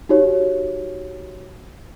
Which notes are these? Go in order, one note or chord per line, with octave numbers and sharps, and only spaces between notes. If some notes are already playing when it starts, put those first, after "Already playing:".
D#4 F#4 G4 C#5